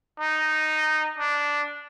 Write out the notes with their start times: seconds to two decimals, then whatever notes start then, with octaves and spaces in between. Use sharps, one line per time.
0.20 D#4
1.18 D4